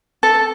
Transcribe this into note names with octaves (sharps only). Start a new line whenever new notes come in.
A4